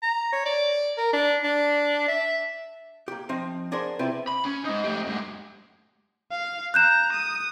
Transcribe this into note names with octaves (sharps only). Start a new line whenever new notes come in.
A#5
C#5
D5
A#4
D4
D4
E5
A#3 G4
F3 C4 D#4 F5
D4 G#4 A#4 C5 F#5 C6
C3 C4 E4 F4 B4
B5
C#4
G#3 D#4
A3 G4
F#2 G#3
F5
A#5 F#6 G6 E7
D#6